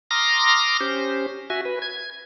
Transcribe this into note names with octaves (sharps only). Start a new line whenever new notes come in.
A#5 C6 D6 D#6 F6 A#6
C#4 G4 C5
F#4 E5 G#5
B4
G#6